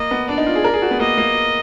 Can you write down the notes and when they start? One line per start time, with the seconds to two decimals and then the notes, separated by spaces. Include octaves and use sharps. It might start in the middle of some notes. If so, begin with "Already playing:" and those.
Already playing: A#3 D#5
0.11 B3
0.29 D4 D5
0.38 D#4
0.47 F4
0.55 G#4
0.64 A#4
0.73 G#4
0.82 F#4
0.91 B3
1.00 A#3 D#5
1.18 A#3